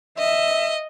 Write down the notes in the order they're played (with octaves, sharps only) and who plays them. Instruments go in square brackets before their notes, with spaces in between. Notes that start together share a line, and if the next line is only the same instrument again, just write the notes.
[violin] D#5 [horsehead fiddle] E5